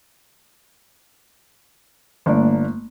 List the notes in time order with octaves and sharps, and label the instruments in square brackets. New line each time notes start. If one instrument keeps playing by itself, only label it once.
[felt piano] G1 D4 [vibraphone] A3 A#3